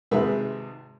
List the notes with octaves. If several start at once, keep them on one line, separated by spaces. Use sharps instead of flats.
G#1 G#2 C3 G#4 B4 E5